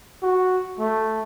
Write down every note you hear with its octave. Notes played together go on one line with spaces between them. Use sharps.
F#4
A3